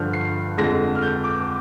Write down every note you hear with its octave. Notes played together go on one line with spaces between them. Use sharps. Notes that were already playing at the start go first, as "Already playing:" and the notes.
Already playing: G2 D3 F3 F6 G6
C7
F2 D3 G#3 A#6
F6
G6
D6